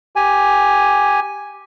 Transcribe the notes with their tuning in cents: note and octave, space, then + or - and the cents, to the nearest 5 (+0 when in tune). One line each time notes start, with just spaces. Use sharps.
G4 +0 G#5 +0